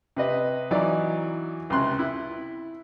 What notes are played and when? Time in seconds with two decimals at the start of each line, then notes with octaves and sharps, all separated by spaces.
0.17 C3 B4 D#5
0.71 E3 F#3 D#4 D5
1.70 C#2 C3 C6 F#6
1.99 E4